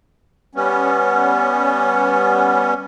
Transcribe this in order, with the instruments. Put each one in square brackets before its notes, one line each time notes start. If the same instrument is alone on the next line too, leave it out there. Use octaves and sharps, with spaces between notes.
[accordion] G3 B3 C#4